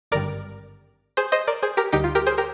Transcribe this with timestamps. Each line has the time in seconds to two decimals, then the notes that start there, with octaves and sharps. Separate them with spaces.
0.11 G#1 G2 D3 G3 A#4 D5
1.17 G#4 C5
1.32 C5 D#5
1.47 A#4 D5
1.62 G#4 C5
1.77 G4 A#4
1.92 D2 D3 G3 D#4 G4
2.04 F4
2.15 G4 A#4
2.27 G#4 C5
2.38 G4 A#4